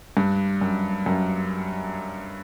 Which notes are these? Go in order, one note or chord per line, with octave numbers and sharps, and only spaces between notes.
G2
F#2
F#2